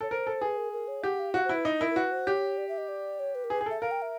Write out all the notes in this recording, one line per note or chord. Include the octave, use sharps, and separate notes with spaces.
A4 C#5
A#4 C5
A4
G#4 B4
A#4
A#4
C#5
G4 F#5
F5
F#4 F5
C5
E4
B4
D#4
E4 A#4
A#4
F#4 B4
C5
G4 C#5
D5
E5
D#5
D5
C#5
B4
A#4
G#4 B4
G#4
A4 E5
A#4 F5
G5
E5